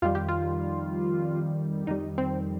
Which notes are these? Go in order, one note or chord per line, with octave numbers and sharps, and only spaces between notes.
F2 D#3 G3 F4
G4
F4
F2 D#3 G3 D#4
C4